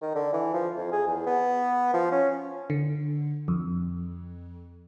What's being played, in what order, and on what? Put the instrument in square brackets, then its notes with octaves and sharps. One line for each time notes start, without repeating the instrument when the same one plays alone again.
[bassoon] D#3
D3
E3
F3
F2
G#4
E2
B3
F3
C#4
[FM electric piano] D3
F2